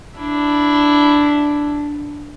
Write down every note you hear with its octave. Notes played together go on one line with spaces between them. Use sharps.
D4 E4